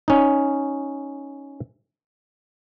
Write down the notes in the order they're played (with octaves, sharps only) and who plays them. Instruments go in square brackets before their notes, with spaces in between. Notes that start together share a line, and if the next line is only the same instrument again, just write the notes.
[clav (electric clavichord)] C#4 D#4